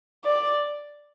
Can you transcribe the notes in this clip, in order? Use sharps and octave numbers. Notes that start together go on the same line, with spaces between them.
D5